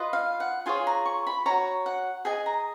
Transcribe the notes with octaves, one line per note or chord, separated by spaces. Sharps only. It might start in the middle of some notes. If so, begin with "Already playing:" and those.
Already playing: F4 B4 D#5
F5
F#5
F4 G#4 C#5 G#5
A#5
C#6
B5
F#4 C#5 A#5
F#5
G#4 D#5 G#5
A#5